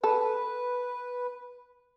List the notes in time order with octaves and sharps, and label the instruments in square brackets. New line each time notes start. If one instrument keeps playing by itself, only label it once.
[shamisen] A4 [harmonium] B4